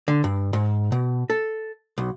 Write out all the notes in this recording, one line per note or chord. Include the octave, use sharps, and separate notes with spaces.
D3
G2
G#2
B2
A4
B1